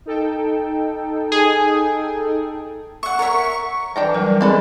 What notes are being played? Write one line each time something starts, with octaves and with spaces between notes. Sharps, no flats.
D#4 A4 G5
G#4
E5 F#5 C#6
A#4 C#5 E5
E3 D4 G5 A#5
F#3 G3 A#4
G#3 B3 C4 D4 G#4 A4 B4